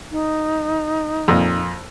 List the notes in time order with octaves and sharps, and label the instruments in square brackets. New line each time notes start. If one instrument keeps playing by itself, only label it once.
[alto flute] D#4
[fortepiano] F2 A#2